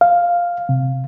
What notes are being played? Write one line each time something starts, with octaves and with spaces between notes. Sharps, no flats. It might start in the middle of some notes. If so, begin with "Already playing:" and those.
F5
C3